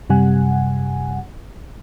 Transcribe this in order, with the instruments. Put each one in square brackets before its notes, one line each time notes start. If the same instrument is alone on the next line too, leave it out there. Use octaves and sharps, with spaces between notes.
[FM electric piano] F#2 C3 G3 F#5 G#5